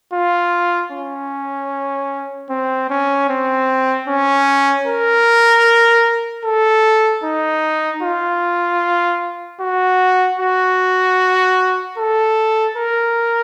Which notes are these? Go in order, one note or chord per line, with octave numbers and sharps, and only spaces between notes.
F4
C#4
C4
C#4
C4
C#4
A#4
A4
D#4
F4
F#4
F#4
A4
A#4